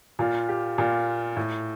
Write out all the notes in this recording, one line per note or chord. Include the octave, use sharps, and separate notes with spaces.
A#2 F4
G4
A#2 F4
A2